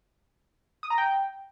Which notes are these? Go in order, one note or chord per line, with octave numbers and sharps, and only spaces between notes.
D#6
A#5
G5